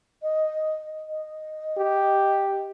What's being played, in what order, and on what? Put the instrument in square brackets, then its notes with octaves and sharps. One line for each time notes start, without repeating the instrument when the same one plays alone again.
[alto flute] D#5
D#5
[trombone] G4